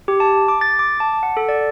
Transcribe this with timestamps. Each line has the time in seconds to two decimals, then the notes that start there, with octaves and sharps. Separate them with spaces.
0.08 G4
0.20 A5
0.48 D6
0.61 A6
0.79 D6
1.00 A5
1.23 F#5
1.37 A4
1.49 D5